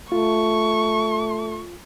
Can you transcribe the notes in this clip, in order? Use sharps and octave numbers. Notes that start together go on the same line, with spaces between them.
A3 F4 C#6